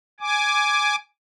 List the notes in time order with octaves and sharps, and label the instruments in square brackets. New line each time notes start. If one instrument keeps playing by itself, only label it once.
[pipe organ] G#5 D6